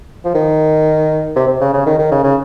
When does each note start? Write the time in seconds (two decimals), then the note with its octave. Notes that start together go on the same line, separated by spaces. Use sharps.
0.25 F3
0.34 D#3
1.36 C3
1.48 C3
1.61 C#3
1.74 C#3
1.86 D#3
1.99 D#3
2.12 C#3
2.24 C#3